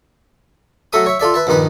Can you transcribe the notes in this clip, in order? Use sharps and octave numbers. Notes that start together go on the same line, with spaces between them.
F#3 A3 A4 E5 D#6
C#5 E5
F4 A4 D5 E5
B4 E5 A5
A#1 G2 D#3 D#4 B4